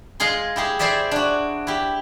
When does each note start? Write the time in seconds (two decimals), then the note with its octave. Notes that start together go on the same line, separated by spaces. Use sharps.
0.20 G#3 F4 G#4 C6
0.56 E4 G4 G#4
0.79 E4 G#4 C5 D5 E5
1.11 D4 F#4
1.67 E4 G4